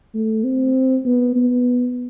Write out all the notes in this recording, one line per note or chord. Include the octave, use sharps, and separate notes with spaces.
A3
C4
B3
B3